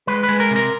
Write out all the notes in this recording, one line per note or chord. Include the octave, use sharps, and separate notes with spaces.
G#3 B4
B4
G#3
A#4
C3
A#4